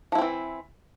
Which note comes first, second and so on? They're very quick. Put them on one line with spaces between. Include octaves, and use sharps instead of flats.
F3 E4 C4 E3